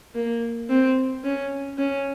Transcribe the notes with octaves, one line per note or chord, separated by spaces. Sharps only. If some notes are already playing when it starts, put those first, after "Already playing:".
A#3
C4
C#4
C#4